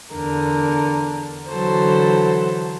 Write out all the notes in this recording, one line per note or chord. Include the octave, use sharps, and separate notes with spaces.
E2 D3 A#4
D3 E3 F#3 A4 C5